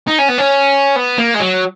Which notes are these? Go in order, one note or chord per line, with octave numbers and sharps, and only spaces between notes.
D#4
C#4
B3
C#4
B3
A#3
G#3
F#3